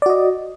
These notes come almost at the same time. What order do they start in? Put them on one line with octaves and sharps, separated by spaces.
D5 F#4 D#5